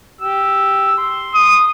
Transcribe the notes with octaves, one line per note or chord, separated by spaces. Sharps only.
G4 E6
C6
D#6